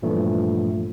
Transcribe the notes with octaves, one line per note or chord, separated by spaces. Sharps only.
G2 A#2 E3 F3 A3